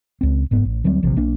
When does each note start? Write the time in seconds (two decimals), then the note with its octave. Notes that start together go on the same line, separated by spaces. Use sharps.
0.21 C#2 C4
0.51 F#1 G#2 B3
0.65 A1
0.84 D2 F#3 G3 C4
1.03 A#1 C3 E3 F3
1.16 B1 A#3 D4